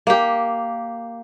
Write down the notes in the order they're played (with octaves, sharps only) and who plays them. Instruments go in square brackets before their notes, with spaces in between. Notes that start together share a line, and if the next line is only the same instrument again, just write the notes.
[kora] A#3 G4